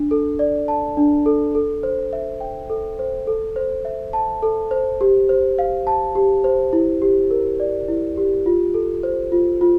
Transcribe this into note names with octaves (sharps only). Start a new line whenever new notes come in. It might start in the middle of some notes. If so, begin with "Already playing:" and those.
Already playing: D4
A4
D5
A5
D4
A4
A4
C5
E5
G5
A4
C5
A4
C5
E5
A5
A4
C5
G4
C5
F5
A5
G4
C5
E4
G4
A#4
D5
E4
G4
F4
A4
C5
F4
F4